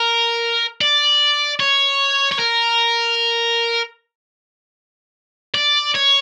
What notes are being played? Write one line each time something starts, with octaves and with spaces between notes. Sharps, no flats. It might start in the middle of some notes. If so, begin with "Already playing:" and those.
Already playing: A#4
D5
C#5
C#5
A#4
D5
C#5